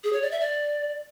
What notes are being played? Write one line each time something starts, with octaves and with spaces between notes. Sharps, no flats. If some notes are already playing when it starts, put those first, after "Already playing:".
G#4
C#5
D5
E5
D5